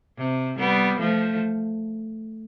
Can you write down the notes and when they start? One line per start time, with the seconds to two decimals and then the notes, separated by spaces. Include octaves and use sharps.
0.18 C3
0.59 G3 B3
1.00 F3 A3